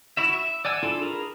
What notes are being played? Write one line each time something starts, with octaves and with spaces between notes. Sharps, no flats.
E4 F#4 E5
E5
D5 F#5 G#5 E6
D4 E4 F4 A4
G#4 A#4 B4